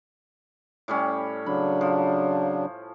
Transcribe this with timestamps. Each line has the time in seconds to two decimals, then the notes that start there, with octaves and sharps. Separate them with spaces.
0.88 A2 G3 C#4
1.46 C#3 F#3 D4 B5
1.81 F3